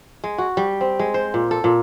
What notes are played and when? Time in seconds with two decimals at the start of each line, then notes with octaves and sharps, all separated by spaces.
0.24 G#3
0.38 F#4
0.57 G3
0.81 C4
0.99 G#3
1.14 C5
1.34 A#2
1.51 A4
1.64 A#2